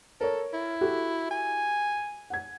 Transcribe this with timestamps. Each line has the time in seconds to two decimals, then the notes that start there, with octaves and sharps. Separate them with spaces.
0.21 A4 A#4 C#5
0.53 E4
0.81 F#4 G4 A4
1.31 G#5
2.30 F#5 G#6